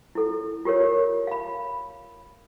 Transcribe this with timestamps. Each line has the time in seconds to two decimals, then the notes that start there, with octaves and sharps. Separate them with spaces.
0.15 E4 A4
0.65 F4 G4 A#4 C#5
1.27 F5 B5